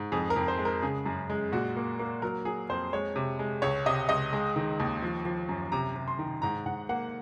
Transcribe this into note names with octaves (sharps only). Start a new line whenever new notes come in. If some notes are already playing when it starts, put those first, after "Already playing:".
Already playing: G#2
F2 G#4
A#4
F2
C5
G#3
A#4
C#3 G#4
F#2
G#3
A#2 F#4
A#3
A#3
F#3 A#4
F#3 G#4
F2 C5
G#3 C#5
C3
G#3
C#2 C#5
C3 D#5
C#2 D#5
G#3
D#3
D#2
F3
F3
F#2
C3 A#5
C3
C6
D#3
G#2 A#5
G#2 F#5
A#3 F#5